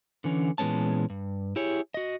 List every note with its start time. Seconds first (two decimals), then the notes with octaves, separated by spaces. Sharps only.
0.24 D3 E3 C#4
0.58 A#2 E3 G#3 B3 C#4 A5
1.10 G2
1.56 E4 G4 G#4 C#5
1.94 F#4 D#5